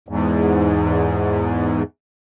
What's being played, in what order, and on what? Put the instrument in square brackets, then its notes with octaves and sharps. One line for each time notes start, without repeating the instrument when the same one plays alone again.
[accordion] E2 G#2